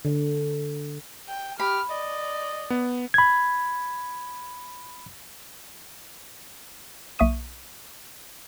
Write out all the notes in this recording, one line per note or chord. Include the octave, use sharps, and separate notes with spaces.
D3
G5
G4 B5 F6
D5 D#5
B3
B5 G#6
B1 A#3 E5 C#6 D#6 D#7